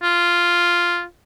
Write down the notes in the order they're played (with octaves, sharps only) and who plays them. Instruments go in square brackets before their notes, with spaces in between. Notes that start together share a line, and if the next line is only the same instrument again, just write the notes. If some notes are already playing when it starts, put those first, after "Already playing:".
[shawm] F4